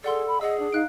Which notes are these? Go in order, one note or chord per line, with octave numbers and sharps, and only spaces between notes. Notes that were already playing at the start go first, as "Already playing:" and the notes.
G#4 A4 D5 F#5 C6
B5
G#4 D#5 F#5 E6
D4
D#4 F5 F#6 D7